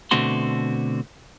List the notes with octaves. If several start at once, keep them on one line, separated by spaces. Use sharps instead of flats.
B2 D3 A3 C4 F#4 C6